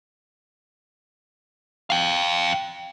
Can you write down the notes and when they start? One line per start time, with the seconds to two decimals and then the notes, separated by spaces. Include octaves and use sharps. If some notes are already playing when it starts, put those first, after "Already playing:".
1.90 F5 G5